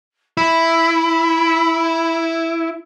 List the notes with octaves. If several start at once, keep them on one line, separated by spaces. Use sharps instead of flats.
E4 B5